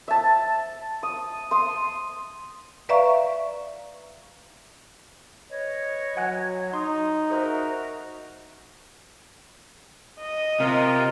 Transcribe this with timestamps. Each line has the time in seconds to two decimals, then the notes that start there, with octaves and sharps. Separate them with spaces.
0.08 E5 A5
1.03 D#6
1.51 C6 D#6
2.89 B4 D5 E5 F5 A#5 C#6
5.49 B4 C#5 D#5
6.17 F#3 F#5 G#5 F#6
6.73 D#4 C6 D#6
7.30 F#4 G#4 A#4 C5 E5 A#5
10.21 D#5
10.60 C3 F4 A#4